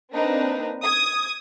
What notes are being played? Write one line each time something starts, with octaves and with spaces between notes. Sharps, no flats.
A#3 C4 D4 D#4 B4
D#6 G#6